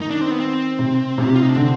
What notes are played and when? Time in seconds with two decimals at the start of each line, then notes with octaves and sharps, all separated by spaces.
0.01 D#3 D#4
0.10 D4
0.21 C4
0.31 B3
0.40 C4
0.79 C3
1.18 C3
1.28 G4
1.35 F4
1.42 D#4
1.49 D4
1.56 D3 C4